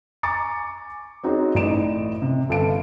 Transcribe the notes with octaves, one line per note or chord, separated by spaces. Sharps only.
G#5 A#5 C#6 D6 A6 C#7
C4 D#4 F#4 G#4 C5 C#5
A1 A2 D#4 D5 D7 E7
C3
G1 A4 F5 D7